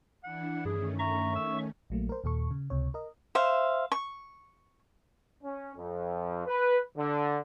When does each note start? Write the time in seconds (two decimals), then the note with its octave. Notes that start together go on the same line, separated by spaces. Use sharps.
0.24 E3 D4 E4 F#5
0.65 G2 D#3 A3 C#4 G#4
0.99 E5 A#5 C#6
1.35 E6
1.90 A#1 F#3 A3 A#3
2.09 A#4 C5
2.24 D#2 A#2 A4 C#6
2.51 C#3
2.70 C#2 C3 C#5
2.94 A#4 D#5
3.35 C5 E5 F5
3.92 C#6
5.43 C#4
5.76 F2
6.47 B4
6.97 D3